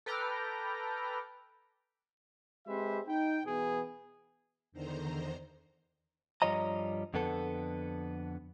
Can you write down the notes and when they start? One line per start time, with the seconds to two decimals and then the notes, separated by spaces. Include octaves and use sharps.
0.06 A4 B4 G5 A#5 D6 F6
2.67 G#3 C4 G4 B4 C5 E5
3.07 D#4 G5
3.46 B2 E3 B3 G#4
4.72 E2 D3 D#3 C5 A#5
6.42 G2 F3 G3 C#5 D#5 A#5
7.14 F2 D3 B3 A4